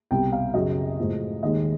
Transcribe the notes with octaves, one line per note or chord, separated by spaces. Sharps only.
C2 B2 G3 G5
F5
F#2 C#3 F#3 D#5
A2 F3 G#3
D#2 D#3 G#3 D#5